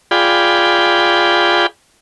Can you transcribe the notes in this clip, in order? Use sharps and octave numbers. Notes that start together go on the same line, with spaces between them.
F4 G#4 D5 G5 B5